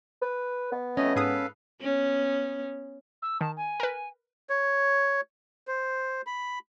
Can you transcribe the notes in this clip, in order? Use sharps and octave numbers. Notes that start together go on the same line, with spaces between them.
B4
B3
F2 A3 C#4 D#5
G#2 G#4 A4 B4 F5 D#6
B3 C#4
E6
D#3 A5
G#5
A#4 B4
C#5
C5
B5